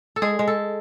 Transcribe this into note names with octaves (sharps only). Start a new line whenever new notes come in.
A4
G#3 G#4
G#3
A4